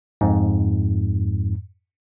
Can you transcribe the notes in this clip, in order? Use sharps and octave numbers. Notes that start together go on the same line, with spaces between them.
F2 G#2